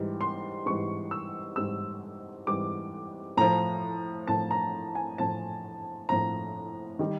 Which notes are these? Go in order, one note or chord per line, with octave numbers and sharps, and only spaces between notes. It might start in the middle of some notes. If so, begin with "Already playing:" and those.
Already playing: G#2 E3 G3
C6
G#2 E3 G3 C#6
E6
G#2 E3 G3 E6
G#2 E3 G3 D6
A2 F3 A#5
A2 F3 A5
A#5
G#5
A2 F3 A5
A2 F3 A#5
D#3 G3